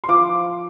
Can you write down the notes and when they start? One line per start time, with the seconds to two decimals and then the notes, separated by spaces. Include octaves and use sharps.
0.04 C6
0.09 F3 D6